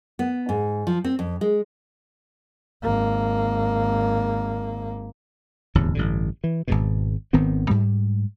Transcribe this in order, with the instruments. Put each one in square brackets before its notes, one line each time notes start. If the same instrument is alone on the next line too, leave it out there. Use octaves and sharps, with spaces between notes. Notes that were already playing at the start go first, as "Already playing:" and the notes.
[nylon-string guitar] B3
G#2
F3
C4
F2
G#3
[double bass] G#1 A#3
[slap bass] D1 E2 G2 C#3
A1 G2 D3
E3
G#1 G#2 B2
G#1 D#3 B3 C4
G#2 G3